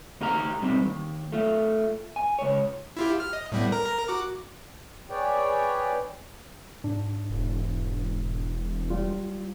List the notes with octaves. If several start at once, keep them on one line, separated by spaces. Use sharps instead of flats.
D2 D#4 G4 F5 A#5
G#2 B2 G3 C4 D#4
D#2
A3 F4
G#5
C#2 C#5
E4 F4 G4
F6
D#5
A2 G3 B3
A#4 A#5
F#4 D6
G#4 B4 C#5 D5 G5
G#2 D4
E1
G3 F4